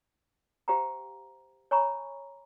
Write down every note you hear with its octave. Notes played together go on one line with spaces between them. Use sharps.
G4 C5 F5 G5 A#5
C#5 G#5 A#5 B5 C#6